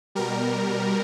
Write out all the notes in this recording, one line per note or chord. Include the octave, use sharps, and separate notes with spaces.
B2 G3 A#4